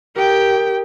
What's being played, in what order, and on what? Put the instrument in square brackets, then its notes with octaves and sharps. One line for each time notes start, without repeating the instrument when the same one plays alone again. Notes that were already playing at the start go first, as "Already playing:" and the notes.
[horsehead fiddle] G4 G5 [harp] A#4 D#6